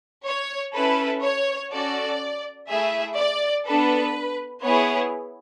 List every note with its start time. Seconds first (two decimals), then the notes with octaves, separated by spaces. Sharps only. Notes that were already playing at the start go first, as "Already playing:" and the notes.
0.25 C#5
0.74 C#4 E4 A4 B4
1.23 C#5
1.72 C#4 F#4 A4 D5
2.69 A3 E4 G#4 E5
3.17 D5
3.66 B3 D4 A4 B4
4.63 B3 E4 G#4 C#5